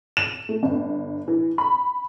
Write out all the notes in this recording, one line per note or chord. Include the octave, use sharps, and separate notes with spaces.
E7
A3
G1
E3
B5